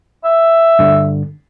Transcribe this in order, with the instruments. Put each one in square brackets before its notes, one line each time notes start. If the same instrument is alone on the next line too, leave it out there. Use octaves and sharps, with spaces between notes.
[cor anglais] E5
[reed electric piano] G2 D3